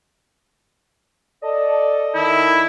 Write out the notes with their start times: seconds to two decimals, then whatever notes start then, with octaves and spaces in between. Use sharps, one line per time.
1.43 A4 D5 D#5
2.15 D#3 E4